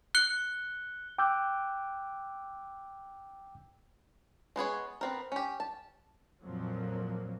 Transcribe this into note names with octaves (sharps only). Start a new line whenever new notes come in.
F#6 C#7 G7
G5 D6 E6 F#6 G6
G#3 B3 G#4 C#5
B3 C4 A#4
C#4 G4
A5
F2 A#2 F3 F#3 A#3